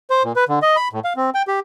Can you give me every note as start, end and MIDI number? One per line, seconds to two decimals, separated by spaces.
0.10 0.23 72
0.24 0.32 46
0.36 0.44 71
0.49 0.59 50
0.62 0.76 75
0.76 0.88 83
0.93 1.00 45
1.04 1.13 77
1.16 1.30 60
1.35 1.42 79
1.48 1.60 67